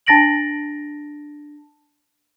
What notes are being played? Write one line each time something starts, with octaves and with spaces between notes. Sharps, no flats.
D4 A5 A6 A#6 D7 F#7